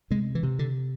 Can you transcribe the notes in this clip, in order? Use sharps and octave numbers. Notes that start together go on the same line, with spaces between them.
C3 G#3
E3
C3
D3